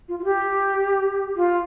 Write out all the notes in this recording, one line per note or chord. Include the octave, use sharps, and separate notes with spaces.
F4
F4
G4
F4